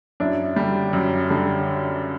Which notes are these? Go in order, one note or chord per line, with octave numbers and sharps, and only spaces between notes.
F#2 D4 E4
D3 G3
F#2
D3 G3